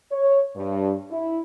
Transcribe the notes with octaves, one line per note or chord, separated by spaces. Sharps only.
C#5
G2
E4